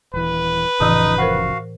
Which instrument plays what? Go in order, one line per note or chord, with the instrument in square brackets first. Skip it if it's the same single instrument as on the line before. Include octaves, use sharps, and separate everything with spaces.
[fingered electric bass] D#1 E3 [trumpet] B4
[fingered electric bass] F1 C#3 F3 [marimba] A2 E3 [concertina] D#4 D#6
[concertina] F#4 F5 [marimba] A#4 C5 F#5